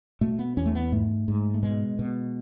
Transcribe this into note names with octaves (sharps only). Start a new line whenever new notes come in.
B2 A3
B3
E2 C#4
A3
B3
G#2 A3
G#2
A3
B2 G#3
B2